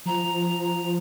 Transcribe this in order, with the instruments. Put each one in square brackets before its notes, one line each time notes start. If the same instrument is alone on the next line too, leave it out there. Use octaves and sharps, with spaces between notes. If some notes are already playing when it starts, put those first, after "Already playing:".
[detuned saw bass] F3 [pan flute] A#5